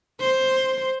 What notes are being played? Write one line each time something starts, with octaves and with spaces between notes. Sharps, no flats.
C5